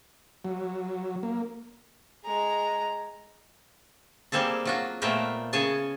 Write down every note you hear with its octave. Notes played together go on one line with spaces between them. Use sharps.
F#3
A#3
G#3 A#5
G3 A#3 C4 G#4 A4
F#3 F4 F#4
A#2 A3 B3 A#4 C5 G5
C#3 G#4 C#5 G#5 A5